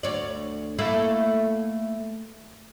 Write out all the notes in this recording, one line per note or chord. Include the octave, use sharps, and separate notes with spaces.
D2 C#5 D5
A3 A#3 E4